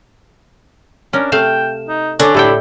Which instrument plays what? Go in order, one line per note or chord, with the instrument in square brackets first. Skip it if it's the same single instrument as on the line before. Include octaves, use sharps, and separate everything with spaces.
[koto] C#4 A#4 [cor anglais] D4
[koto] C3 A3 F5 [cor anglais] G5 [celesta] E7
[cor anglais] D#4
[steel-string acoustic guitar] D3 [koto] D4 [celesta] A4 G#5 A6 [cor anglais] C#5
[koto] A2 A4 G5 [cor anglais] E4 [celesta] G4 E5